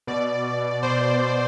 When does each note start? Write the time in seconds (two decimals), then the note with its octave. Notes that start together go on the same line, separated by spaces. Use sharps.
0.07 B2 D5
0.83 B2 C5